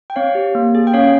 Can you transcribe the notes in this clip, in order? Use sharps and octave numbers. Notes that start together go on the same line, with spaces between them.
G5
C4 C#5 F5
G4
A#3
G#4
G5
C#4 C#5 F5